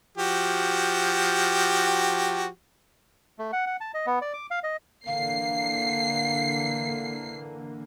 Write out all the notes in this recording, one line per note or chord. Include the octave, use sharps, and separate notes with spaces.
F3 F#4 G4
A3
F#5
F#5
A5
D#5
B3
D5
D6
F5
D#5
D3 E3 A#3 F5 C7